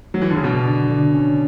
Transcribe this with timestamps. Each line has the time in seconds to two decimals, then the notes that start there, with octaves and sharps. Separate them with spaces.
0.14 F#3
0.21 E3
0.30 D3
0.36 C#3
0.44 B2 D4
0.67 D3
0.89 D3
1.13 C#4